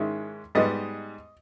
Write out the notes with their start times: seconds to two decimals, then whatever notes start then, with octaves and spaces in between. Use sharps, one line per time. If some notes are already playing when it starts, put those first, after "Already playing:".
Already playing: G#2 D#3 G#3 C#4 E4
0.55 G#2 G3 B3 D#5